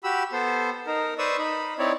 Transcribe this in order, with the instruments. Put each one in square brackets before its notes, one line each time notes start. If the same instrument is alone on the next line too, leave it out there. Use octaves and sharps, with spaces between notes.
[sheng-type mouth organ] F#4 G4 B5 E6
B3 A4 C5
D#4 A#4
B4 C5 D5 C#6 D#6 E6
D#4 B5
C4 D#4 E4 C#5 D5